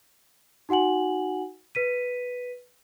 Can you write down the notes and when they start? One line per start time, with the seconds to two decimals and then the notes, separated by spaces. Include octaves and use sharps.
0.69 D#4 F#4 F#5 G#5 F#7
1.75 B4 B6 D#7